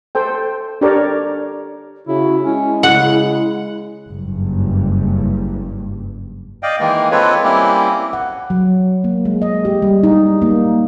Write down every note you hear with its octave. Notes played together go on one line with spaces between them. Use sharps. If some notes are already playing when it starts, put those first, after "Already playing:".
A4 C5 G5
D4 G4 A4 A#4 C#5 D5
C#3 E4 F#4
G#3 C#4 E4
C#3 F#5
F#1 G2
D5 D#5 F5 G5
D#3 E3 G#3 A#3
G#3 C4 F4 A4 B4 C#5
G3 A#3 C4 C#4 E4 G4
F#5
F#3
A#3
G#3
D#5
G4
G3
D#4
A#3